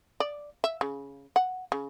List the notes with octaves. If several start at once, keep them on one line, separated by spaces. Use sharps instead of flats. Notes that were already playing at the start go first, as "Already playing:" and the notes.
D5
E5
C#3
F#5
C#3